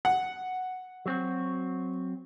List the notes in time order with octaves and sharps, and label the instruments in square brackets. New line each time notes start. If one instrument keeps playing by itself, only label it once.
[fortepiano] F#5
[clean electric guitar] F#3 C4 F#4